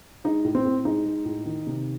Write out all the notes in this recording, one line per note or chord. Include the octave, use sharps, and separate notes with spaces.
G#3 D#4
A2
C4
A2
G#3 D#4
G#3
A2
D#3
C3